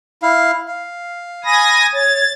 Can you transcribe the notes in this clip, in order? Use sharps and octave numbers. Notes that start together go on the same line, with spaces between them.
E4 F5
F5
G#5 B5 D#6 A#6
C#5 A6